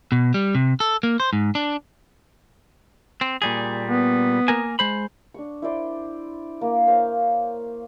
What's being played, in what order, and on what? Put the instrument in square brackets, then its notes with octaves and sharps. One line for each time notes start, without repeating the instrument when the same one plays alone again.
[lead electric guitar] B2
G3
C3
A4
A#3
C5
G#2
D4
[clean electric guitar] C4
A#2 G3 G#4
[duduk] B3
[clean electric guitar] A#3 A#4 G#5
G#3 C5 B5
[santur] D4 C#6
E4 C5 D5 C6
A#3
C5 C#5 F5